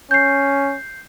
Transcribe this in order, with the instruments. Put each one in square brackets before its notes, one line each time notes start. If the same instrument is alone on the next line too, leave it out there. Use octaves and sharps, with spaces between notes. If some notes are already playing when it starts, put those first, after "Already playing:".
[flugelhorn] C#4 [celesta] G6 C7